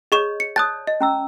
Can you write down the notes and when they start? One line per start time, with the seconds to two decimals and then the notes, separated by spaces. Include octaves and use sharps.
0.12 G#4 C#5 D#5 C#6 E7
0.40 C#7
0.56 C#5 D5 A5 D#6 F#6 A6
0.87 D#5
1.01 C#4 A#5 E6